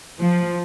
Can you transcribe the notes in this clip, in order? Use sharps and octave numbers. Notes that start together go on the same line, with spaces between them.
F3